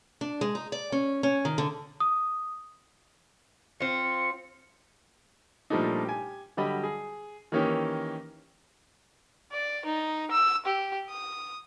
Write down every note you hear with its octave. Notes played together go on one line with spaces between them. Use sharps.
D4
G#3
D#4
D5
C#4
C#4
D#3
D3
D#6
C4 F4 C#7
A#2 F3 G3 A3 D4 D#4
G4 G#5
D3 F#3 G3 G4 D#5 B5
G#4
D#3 E3 A#3 C#4 D#4 G4
D5
D#4
E6
G4
D#6